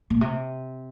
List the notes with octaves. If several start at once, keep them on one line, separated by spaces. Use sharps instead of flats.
A#2
C3